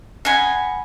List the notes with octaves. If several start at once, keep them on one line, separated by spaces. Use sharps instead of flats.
D#5 F#5 G#5 B5